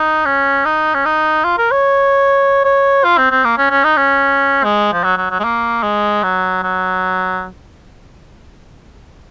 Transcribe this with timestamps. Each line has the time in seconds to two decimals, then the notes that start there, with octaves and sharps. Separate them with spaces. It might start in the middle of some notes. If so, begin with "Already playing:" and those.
Already playing: D#4
0.25 C#4
0.65 D#4
0.94 C#4
1.05 D#4
1.44 F4
1.58 A#4
1.71 C#5
2.64 C#5
3.04 F4
3.17 C4
3.31 C4
3.44 A#3
3.58 C#4
3.70 C#4
3.84 D#4
3.97 C#4
4.64 G#3
4.93 F3
5.04 F#3
5.17 F#3
5.30 F#3
5.39 G#3
5.44 A#3
5.83 G#3
6.23 F#3
6.63 F#3